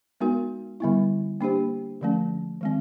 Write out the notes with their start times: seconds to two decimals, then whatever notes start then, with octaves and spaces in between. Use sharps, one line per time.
0.20 G#3 B3 D#4 F#4 A#4
0.80 D3 G3 B3 E4
1.41 A#3 D4 G4 C5
2.01 D3 F3 A3 C#4
2.61 D#3 G#3 C4